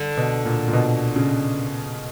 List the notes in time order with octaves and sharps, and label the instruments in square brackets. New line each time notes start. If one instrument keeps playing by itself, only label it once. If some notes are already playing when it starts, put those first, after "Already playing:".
Already playing: [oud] D3
[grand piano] B2
A#2
A#2
B2
C#3